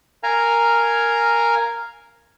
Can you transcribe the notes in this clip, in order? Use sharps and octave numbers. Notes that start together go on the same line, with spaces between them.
A#4 F5 G#5 A#5